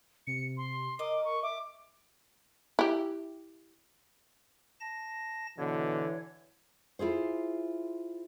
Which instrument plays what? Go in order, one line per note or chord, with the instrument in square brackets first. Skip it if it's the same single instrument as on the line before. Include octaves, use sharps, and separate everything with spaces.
[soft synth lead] C3 [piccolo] C#7
[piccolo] C6
[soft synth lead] A#4 [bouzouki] D#5 [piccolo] D6
[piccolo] C#6
[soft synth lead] E5 [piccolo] D6
[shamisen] E4 G4
[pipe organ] A5 A#6
[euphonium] B2 [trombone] D3 [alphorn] E3 [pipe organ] C#5
[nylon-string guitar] E4 F4 G#4 C5